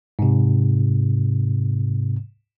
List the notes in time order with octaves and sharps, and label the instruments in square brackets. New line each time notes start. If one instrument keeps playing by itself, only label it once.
[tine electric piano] G#2 C3